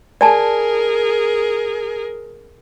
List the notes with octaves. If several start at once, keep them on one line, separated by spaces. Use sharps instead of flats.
G#4 A#4 D5 G#5 A5